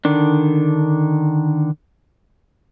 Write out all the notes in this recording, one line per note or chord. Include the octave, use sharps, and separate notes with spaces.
D3 D#3 D4